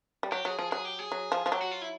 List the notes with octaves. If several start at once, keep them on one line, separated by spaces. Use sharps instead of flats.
G3
F#3 G4
F#3 G#4
F3 G#4
F#3 G#4
G4
G#4
F#3
F3
F3
F#3 G4
F#4
F4
E4